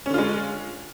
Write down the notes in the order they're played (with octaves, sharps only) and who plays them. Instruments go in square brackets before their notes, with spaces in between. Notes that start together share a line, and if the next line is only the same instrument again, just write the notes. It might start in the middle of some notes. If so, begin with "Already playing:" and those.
[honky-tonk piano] C#4
D3
F4
G#3